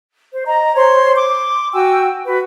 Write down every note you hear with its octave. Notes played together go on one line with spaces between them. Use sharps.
C5
D#5 A#5
C5 C#5 C6
C6 D6
F#4 G5 G#5 E6
F#4 B4